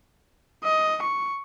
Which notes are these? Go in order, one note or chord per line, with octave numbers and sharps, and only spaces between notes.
D#5
C#6